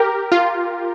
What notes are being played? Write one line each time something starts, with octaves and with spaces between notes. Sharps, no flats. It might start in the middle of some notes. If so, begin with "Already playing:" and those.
Already playing: G4 A#4
F4